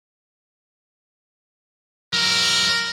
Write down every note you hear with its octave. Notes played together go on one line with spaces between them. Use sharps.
F#3 E4 A#4